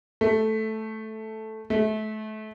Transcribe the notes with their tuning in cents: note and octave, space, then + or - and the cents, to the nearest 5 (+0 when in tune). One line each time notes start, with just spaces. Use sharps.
A3 -5
A3 -30